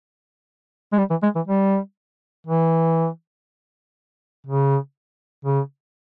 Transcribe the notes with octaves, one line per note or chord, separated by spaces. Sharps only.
G#3
G3
E3
G#3
E3
G3
E3
C#3
C#3